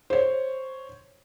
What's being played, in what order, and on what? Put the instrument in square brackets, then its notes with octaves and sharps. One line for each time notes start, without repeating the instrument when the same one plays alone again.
[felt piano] C5 C#5